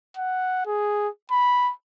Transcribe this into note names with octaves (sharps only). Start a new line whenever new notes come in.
F#5
G#4
B5